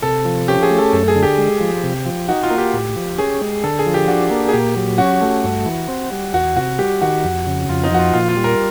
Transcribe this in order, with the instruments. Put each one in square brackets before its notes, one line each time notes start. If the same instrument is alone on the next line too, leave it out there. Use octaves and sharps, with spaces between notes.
[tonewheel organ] C3 [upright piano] A4
[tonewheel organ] F3
[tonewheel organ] C#4 [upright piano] G4
[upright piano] G#4
[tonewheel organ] A3
[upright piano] A4
[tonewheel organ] F#2 [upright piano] A4
[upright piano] G#4
[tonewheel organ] D3
[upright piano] G4
[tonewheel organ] G#3
F3
C3
F3
[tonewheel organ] D#4 [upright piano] F#4
[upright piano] F4
[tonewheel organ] A#3
[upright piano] G4
[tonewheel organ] A2
F3
[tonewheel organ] C#4 [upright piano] G#4
[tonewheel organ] G#3
[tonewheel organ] D3 [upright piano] A4
[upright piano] G#4
[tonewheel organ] F3
[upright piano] G4
[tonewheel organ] D4 [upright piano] F#4
[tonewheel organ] A#3
[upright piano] G#4
[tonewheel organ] A#2 [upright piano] G4
[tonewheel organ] F#3
[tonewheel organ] C#4 [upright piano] F#4
[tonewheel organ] A3
G2
E3
C4
G3
[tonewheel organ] E2 [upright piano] F#4
[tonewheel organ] C3 [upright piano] F#4
[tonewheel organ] G3 [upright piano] G4
[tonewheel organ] D#3 [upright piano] F#4
[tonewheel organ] F2
C#3
[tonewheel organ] F2 [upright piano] F4
[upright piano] D#4
[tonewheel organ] F3 [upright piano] F#4
[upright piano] F4
[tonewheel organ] A#2 [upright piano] F4
[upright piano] F4
[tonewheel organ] G3
[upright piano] A#4